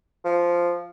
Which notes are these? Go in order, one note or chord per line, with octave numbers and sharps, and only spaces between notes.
F3